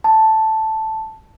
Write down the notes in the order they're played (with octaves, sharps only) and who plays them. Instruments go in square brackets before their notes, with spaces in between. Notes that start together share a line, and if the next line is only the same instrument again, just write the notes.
[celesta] A5